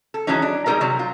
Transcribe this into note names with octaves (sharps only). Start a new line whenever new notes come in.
A4
E3 F#3 G#3 C#4 D#4
D4
G3 G#3 D#4 A4 A#4 D5
C3 F#3
F4